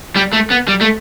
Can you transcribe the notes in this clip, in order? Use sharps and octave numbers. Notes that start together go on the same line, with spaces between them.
G3
A3
B3
G3
A3